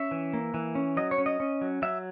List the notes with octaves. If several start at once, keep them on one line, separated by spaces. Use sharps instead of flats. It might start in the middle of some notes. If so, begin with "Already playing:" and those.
Already playing: C#4 E5
E3
A#3
E3
C#4
F#3 D#5
C#5
C#4
D#5
C#4
F#3
F#3 E5